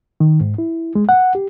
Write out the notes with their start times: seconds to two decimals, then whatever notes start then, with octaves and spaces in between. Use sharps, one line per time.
0.20 D#3
0.41 G#2
0.58 E4
0.95 G#3
1.09 F#5
1.35 G4